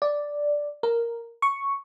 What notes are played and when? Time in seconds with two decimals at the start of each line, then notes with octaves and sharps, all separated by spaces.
0.02 D5
0.83 A#4
1.42 C#6